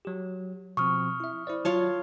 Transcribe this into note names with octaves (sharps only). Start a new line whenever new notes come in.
F#3 G4
B2 F3 C4 C#6 D#6 F6
E4 E5
E4 C5 D5
F#3 F4 C#5 A5